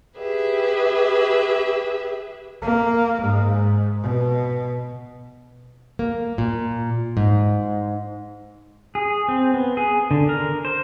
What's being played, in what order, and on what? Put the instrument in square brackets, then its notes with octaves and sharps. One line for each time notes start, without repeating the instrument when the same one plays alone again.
[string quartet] G4 G#4 B4 E5
[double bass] A#3
G#2
B2
[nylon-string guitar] A#3
A#2
G#2
[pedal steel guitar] G#4
C4
B3
G#4
D3
A#4
C5